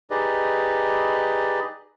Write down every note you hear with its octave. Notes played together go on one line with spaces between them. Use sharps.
D#4 G4 G#4 B4 D5 D#5